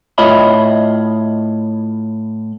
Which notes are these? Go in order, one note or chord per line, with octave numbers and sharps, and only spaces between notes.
A2 F4 C#5 D#5 E5 B5